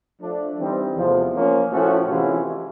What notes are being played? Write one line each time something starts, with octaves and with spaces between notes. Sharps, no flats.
F3 A3 D4
E3 G3 C4 D#4
E2 C3 F3 A3
F3 A#3 C#4
A2 F3 A3 C#4 F#4
C3 E3 G#3 C#4 F4